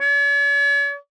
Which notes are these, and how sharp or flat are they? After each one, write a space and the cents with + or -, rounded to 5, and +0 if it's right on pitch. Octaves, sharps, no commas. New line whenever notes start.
C#5 +45